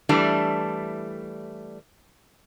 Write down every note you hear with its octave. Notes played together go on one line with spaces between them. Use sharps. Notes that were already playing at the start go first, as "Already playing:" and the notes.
E3 G3 A3 D4